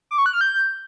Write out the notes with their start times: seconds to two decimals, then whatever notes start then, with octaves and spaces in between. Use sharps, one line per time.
0.11 D6
0.18 C#6
0.26 F#6
0.33 F6
0.41 G6